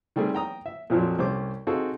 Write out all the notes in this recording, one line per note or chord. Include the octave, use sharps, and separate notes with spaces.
D#3 G3 A3 C4 G#4
G5 A#5 D#6
E5
F2 A#2 F3 F#3 C4
C2 C#4 G4 C5 D6
C4 D#4 F#4 G#4 A4 F5